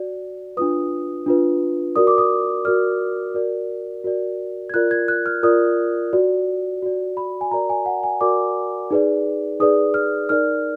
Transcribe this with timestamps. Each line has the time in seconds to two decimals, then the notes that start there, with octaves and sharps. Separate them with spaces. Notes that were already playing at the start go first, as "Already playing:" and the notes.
Already playing: F#4 D5
0.57 D4 F4 B4 D#6
1.26 D4 F4 B4
1.96 F#4 A#4 D5 D#6
2.07 D6
2.18 D#6
2.65 F#4 A#4 D5 F6
3.34 F#4 A#4 D5
4.04 F#4 A#4 D5
4.69 G#6
4.74 F4 A#4 D5 F#6
4.91 G#6
5.08 F#6
5.26 F6
5.43 F4 A#4 D5 D#6
6.13 F#4 D5
6.83 F#4 D5
7.17 B5
7.41 G#5
7.51 F#4 A#4 D5 A#5
7.70 G#5
7.86 F#5
8.03 G#5
8.21 F#4 A#4 D5 D6
8.91 D#4 G#4 B4 D5
9.60 D#4 G#4 B4 D5 D#6
9.94 F6
10.29 D#4 A#4 D5 F6